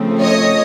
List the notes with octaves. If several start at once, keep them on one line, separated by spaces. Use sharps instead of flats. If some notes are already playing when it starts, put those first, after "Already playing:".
Already playing: C#3 F3 A3 C4
C#5 D#5